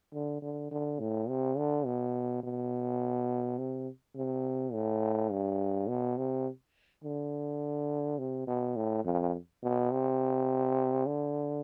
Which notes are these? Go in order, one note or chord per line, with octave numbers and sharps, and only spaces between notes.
D3
D3
D3
A2
C3
D3
B2
B2
C3
C3
A2
G2
B2
C3
D3
C3
B2
A2
F2
B2
C3
D3